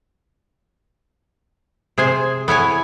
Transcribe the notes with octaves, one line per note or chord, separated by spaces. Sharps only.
C3 G#4 C5 G#5
B3 E4 C#5 G#5